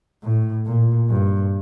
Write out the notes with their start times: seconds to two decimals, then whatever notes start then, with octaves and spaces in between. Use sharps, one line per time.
0.23 A2
0.66 A#2
1.09 G2